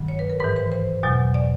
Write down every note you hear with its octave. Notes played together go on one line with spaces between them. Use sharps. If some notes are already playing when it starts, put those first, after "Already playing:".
Already playing: G2 D#3 F#3
C#5
B4
A#4
G#2 E3 B4
C5
C5
E2 B2 F#3
D5